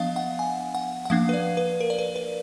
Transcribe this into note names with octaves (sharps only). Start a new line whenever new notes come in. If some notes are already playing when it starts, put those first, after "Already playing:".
Already playing: F3 B3 D4 D#5 F5
F#5
G#5
F#5
F#5
F3 A#3 D4 F5
B4
D5
B4
A#4
D5
B4
B4